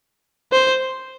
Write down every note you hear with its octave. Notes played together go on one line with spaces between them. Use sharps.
C5